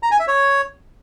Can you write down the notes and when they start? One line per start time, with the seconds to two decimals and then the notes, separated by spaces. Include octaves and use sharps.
0.03 A#5
0.11 G#5
0.19 E5
0.28 C#5